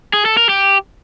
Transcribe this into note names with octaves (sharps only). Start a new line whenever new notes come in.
G#4
A4
A#4
G4